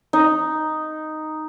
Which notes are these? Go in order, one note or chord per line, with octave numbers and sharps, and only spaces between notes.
D#4